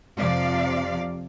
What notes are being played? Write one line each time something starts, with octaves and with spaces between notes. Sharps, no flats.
F2 C3 F3 D5 F5